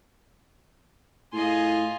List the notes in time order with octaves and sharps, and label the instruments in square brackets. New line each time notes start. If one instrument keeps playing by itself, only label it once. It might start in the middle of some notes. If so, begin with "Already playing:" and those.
[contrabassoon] A2 [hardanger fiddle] F4 G#4 [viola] D#5 C6